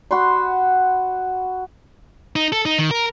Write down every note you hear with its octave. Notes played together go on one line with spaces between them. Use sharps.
F#4 F#5 B5 C6
D#4
A4
D#4
D#3
A#4